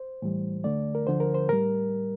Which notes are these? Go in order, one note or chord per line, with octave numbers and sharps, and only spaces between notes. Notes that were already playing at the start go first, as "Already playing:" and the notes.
Already playing: C5
A2 E3 G3
D2 D3 A3 D5
A#4
D2 D3 F3 C5
A#4
C5
A2 G3 A#4